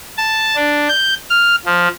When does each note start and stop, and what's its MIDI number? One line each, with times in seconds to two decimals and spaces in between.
0.17 0.56 81
0.56 0.88 62
0.88 1.14 91
1.30 1.56 89
1.65 1.88 53